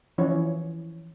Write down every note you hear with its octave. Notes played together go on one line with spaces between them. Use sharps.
E3 F3 C#4 E4 C#5